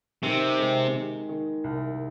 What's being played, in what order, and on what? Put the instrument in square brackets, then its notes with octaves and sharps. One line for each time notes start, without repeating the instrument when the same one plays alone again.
[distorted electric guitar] C3 [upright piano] D#3
[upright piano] G#3
D#3
D#3
C2